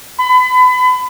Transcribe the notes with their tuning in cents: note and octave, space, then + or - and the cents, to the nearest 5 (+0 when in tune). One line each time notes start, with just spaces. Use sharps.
B5 +30